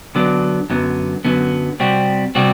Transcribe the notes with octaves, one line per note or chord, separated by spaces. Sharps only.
D3 F#3 B3 D4
F#2 D3 F#3 B3
F#2 D3 F#3 B3
C3 G3 C4 F#4
C3 G3 C4 F#4